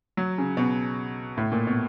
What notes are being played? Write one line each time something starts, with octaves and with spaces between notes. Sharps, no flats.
F#3
C#3
B2
A2
A#2
B2